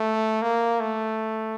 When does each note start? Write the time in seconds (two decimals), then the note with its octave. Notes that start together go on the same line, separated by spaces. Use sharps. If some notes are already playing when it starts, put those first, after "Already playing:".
Already playing: A3
0.42 A#3
0.80 A3